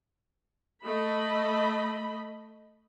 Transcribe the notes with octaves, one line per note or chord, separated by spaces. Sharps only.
A3 D#5 B5